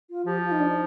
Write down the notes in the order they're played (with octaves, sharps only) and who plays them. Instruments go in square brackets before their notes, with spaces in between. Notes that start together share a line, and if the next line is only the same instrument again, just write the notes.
[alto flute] F4
[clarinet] F3 [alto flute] G4
[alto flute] F4
D#4
D4
D#4